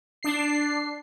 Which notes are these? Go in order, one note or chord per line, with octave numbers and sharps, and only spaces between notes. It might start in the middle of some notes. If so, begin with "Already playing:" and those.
D4 C7